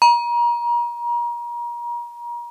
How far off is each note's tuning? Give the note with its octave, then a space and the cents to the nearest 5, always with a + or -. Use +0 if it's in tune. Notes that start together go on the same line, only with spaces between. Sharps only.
A#5 +35